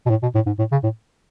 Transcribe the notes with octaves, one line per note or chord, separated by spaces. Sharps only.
B2
A2
B2
A2
G#2
A2
C#3
A2